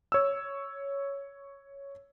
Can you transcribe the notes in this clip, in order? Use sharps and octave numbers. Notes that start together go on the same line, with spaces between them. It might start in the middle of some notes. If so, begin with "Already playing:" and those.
C#5 E6